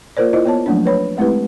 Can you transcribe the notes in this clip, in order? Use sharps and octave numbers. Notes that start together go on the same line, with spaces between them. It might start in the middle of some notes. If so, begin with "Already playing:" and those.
A#3 F4 A#4 C5 D5
E4 F4 C5 D#5
B3 C#5 A5
F3 F#3 A3 A#3 C#4 D4
B4 C#5 B5
G#3 A3 C4 E4 G4 B4